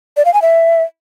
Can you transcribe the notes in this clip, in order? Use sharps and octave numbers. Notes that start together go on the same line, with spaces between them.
D5
F5
G#5
E5